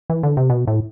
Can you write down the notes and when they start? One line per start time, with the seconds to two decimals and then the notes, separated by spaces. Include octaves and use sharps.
0.10 E3
0.23 D3
0.37 C3
0.50 B2
0.67 A2